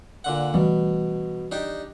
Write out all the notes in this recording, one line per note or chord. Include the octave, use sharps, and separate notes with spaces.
A#2 D3 F#5
B2 E3 G3 A3
D4 D#4 G4